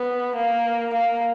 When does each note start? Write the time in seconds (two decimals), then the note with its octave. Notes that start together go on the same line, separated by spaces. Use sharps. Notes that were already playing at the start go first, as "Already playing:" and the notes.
Already playing: B3
0.36 A#3
0.94 A#3